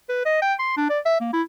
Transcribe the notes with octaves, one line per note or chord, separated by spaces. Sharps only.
B4
D#5
G5
C6
D4
D5
E5
A#3
E4